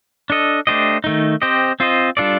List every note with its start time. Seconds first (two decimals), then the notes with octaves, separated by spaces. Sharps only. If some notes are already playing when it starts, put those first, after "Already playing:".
0.30 D4 A4 D#5
0.67 A3 D4 G4 C5 D#5
1.04 D#3 A3 D#4
1.42 C4 G4 C5 D#5
1.80 C4 F4 C5 D#5
2.17 G3 D4 F4 A4 D5